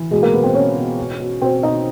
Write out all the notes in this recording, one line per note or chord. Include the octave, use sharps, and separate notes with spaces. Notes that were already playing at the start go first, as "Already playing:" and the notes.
Already playing: E3
B2 G#3 G#4
A#3 A#4
B2 B3 B4
C4 C5
B2 C#4 C#5
B2
B2
B2
B2 C4 C5
B2 D#4 D#5